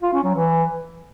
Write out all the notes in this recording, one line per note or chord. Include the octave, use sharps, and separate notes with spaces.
F4
C#4
F#3
E3